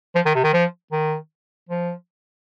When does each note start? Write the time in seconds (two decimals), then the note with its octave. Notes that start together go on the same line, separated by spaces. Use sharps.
0.15 F3
0.26 D#3
0.35 C3
0.44 D#3
0.53 F3
0.92 D#3
1.69 F3